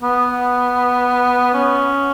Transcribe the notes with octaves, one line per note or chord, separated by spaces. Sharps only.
B3
C#4